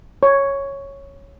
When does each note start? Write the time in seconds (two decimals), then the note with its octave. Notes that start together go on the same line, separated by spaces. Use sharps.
0.23 C#5